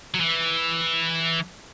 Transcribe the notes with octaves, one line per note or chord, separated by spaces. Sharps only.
F#3
E3